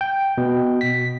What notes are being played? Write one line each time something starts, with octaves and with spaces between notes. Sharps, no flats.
G5
B2
B6